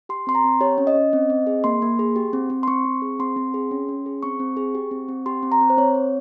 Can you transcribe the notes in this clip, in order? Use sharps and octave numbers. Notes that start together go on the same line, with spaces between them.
G4 C6
C4 C6
A#5
C4
G4 C#5
C#4
D#5
C#4
C4
C4
G#4
A#3 C6
A#3
G#4
G4
C4
C4
C6
C4 C#6
C4
G#4
C4 C6
C4
G#4
C#4
C#4
G#4
C4 C#6
C4
G#4
G4
C4
C4
G4 C6
C4
A#5
C4
C5
C4 C#5
C4